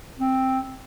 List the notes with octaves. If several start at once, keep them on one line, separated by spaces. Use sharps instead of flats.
C4